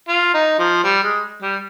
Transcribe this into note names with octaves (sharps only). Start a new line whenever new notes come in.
F4
D#4
F3
G3
G#3
G3